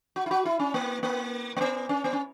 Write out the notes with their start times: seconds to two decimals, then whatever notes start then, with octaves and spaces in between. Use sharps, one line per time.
0.16 F#4
0.26 E4
0.31 F#4
0.45 E4
0.59 C#4
0.74 A#3
1.03 A#3
1.56 A#3
1.61 B3
1.89 C#4
2.04 B3
2.13 C#4